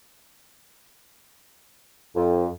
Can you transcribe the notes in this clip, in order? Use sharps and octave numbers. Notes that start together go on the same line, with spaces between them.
F2